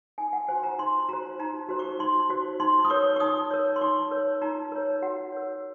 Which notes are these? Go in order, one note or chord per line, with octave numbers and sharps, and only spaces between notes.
D#4 G#5
F#5
F#4 C5 G#5
A#5
D#4 C6
F#4 C5 A#5
D#4 A#5
F#4 C5
C#6
D#4 C6
F#4 C5
D#4 C6
D#6
A#4 C#5 C#6
C#6
D#4 D#6
A#4 C#5
C6
D#4 C#6
A#4 C#5
D#4 A#5
A#4 C#5
F#4 F#5
A#4 C#5